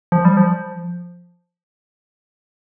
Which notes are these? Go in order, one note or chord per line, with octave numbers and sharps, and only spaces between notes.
F3
G3
F3